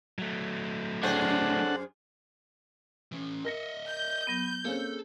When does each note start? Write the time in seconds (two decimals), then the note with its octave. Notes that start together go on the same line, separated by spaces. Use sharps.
0.19 F#3 A3
1.03 F#2 D4 G#4 A4 C5 C#5 F#5
3.12 E3 C#4
3.45 A#4 D#5 E5 A#6 C#7
3.89 G6
4.27 F#3 B3
4.65 A#3 C4 C#4 G#4 A4